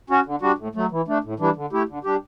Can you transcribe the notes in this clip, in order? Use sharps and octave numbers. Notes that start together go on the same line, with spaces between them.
C#4 F#4
D3
G3 D4 F#4
A2
F#3 A3
E3
A3 D4
A2
E3 G3 D4
D3
A3 E4 G4
D3
G3 D4 G4